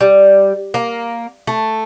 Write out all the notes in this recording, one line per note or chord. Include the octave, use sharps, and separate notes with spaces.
G3
A#3
A3